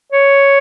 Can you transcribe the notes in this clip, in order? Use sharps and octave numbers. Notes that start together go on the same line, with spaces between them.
C#5